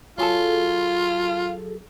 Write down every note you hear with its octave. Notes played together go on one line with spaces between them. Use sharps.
F#3 F4 G#4 A4